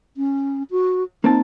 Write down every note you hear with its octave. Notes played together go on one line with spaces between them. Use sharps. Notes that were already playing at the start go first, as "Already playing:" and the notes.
C#4
F#4
A#3 C4 D#4 A5